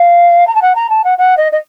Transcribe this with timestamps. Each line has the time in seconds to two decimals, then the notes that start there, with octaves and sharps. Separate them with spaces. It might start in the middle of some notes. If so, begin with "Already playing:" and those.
Already playing: F5
0.47 A#5
0.55 A5
0.62 F#5
0.75 A#5
0.90 A5
1.04 F#5
1.18 F#5
1.37 D#5
1.52 D#5